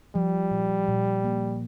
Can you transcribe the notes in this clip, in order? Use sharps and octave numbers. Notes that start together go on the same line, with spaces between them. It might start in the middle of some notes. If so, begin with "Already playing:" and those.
F3 G3
A#2
A#2
A#3